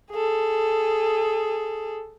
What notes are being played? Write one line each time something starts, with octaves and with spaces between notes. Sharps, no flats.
G#4 A4